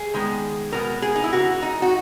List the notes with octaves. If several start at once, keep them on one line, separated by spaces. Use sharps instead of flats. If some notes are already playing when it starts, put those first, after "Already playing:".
Already playing: G#4
D#3 G#3 B3
B2 G#3 B3 A#4
G#4
D#4
E4
C#3 E3 A#3 F#4
D#4
F#4